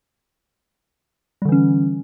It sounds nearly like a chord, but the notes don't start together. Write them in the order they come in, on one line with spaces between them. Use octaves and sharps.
G3 D3 E3 C#4